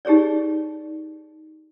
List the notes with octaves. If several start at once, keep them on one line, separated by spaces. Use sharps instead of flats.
D#4 G4 G#4 C#5 D5